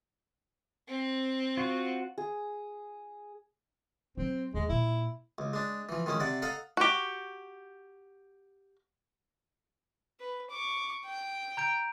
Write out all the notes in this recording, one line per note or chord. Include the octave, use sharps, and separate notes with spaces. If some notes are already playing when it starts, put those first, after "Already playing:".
C4
F4 F#4
G#4
F#3 C4
D#2 G#3
A#2 E4
C#2
G#3 D4
E3 F3
D#3 F3 G#3 C#4
C3 D5 F#5
A4 D#5 F5 F#5 A#5
F#4 G4
B4
C#6 D6
G5
A#5 G6 D7